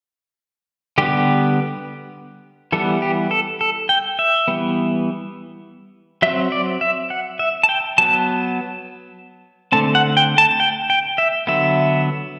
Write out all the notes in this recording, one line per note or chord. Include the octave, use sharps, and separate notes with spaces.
D3 G3 B3 G4
E3 G3 B3 A4
G4
A4
A4
G5
E5
E3 G3 B3
F#3 C4 E5
D5
E5
F#5
E5
A5
G5
F#3 B3 A5
D3 A3 C4 A5
F#5
G5
A5
G5
G5
E5
D3 F#3 B3 E5